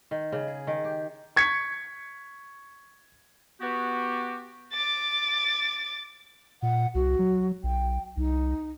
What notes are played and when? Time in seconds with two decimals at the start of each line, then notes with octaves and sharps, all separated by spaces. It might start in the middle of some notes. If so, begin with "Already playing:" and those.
0.11 D#3
0.32 C#3
0.47 G#4
0.67 D#3
0.84 G4
1.36 C#6 G#6 B6 C#7
3.61 B3 F#4 G4
4.73 D6 A6
6.62 A#2 F#5
6.95 C2 F#4
7.19 F#3
7.64 B1 G5
8.17 C2 D#4